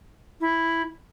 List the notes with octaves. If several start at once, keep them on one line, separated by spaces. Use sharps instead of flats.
E4